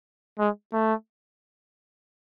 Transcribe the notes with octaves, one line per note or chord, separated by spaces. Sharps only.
G#3
A3